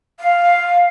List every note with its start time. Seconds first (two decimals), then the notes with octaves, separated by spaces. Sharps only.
0.20 F5